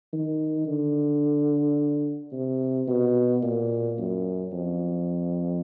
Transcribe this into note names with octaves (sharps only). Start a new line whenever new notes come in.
D#3
D3
C3
B2
A#2
F#2
F2